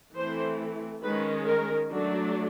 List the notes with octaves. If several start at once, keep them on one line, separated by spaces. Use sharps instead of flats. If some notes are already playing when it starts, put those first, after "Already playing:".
E3 A3 C4 C5
D#3 G#3 C#4 B4
A#4
F#3 A3 D4